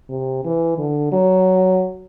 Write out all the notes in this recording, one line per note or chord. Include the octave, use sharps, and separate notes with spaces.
C3
E3
D3
F#3